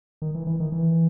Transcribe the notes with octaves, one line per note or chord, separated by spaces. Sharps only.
D#3
E3
E3
D#3
E3